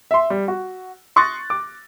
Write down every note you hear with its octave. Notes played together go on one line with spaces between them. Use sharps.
E5 C6
G3
F#4
C6 C#6 D#6 F#6 A6 A#6
D6